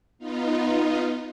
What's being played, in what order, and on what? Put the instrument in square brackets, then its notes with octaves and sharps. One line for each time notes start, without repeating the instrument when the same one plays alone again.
[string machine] B3 D#4 F4